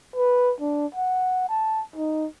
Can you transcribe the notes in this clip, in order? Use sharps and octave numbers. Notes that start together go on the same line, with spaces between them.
B4
D4
F#5
A5
D#4